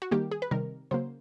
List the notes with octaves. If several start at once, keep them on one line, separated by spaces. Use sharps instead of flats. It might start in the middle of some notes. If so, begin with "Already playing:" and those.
F#4
D#3 G3 A#3 G4
G#4
B4
C3 D#3 G3 A#4
C#3 F#3 A#3 C5